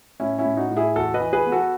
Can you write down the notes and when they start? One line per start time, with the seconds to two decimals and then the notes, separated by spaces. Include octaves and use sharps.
0.20 A2 C#4 E4
0.38 C#4 E4
0.45 A2
0.57 D#4 F#4
0.70 A2
0.77 E4 G#4
0.96 E2 F#4 A4
1.14 B4 D#5
1.20 E3
1.33 G#4 B4
1.46 B3
1.52 F#4 A4